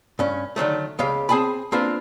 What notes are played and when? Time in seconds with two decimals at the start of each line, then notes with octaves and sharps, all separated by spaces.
0.19 G2 C#4
0.56 D3 D#3 F#3 A3
0.99 C#2 C#3 G4 F5
1.29 C4 G#4 G#5 A5 B5
1.72 A#3 C4 D4 F4 B4